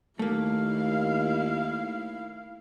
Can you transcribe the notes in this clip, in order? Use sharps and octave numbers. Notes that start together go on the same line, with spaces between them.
D#2 A3 A#3 E4 F5